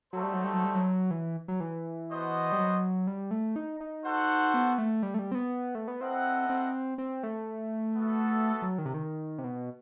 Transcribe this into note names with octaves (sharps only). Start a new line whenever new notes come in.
F#3 A3 D#4 F#4 A4 C5
G3
F#3
G3
F#3
G3
F#3
E3
F#3
E3
B3 F#4 C5 D#5
G3
F#3
G3
A3
D#4
D#4
F#4 A4 C5 F#5
B3
A3
G3
A3
G3
C4
B3
A3
B3
C4 E4 A4 D#5 F#5
C4
C4
A3
B3 F#4 A4 E5
F#3
D#3
C3
D#3
C3
B2